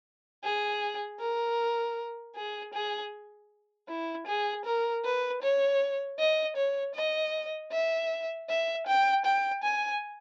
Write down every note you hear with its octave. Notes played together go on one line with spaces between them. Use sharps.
G#4
A#4
G#4
G#4
E4
G#4
A#4
B4
C#5
D#5
C#5
D#5
E5
E5
G5
G5
G#5